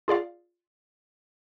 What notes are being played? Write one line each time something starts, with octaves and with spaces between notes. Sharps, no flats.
F4 G#4 D5 F5